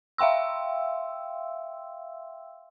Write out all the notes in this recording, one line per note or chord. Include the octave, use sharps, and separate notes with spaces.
E5 F5 G5 C6 E6